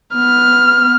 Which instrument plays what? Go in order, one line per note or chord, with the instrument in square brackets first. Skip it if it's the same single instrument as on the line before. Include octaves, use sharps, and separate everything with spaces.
[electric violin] B3 F6